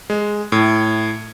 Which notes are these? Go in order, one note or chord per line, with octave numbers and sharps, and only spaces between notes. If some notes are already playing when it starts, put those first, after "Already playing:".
G#3
A2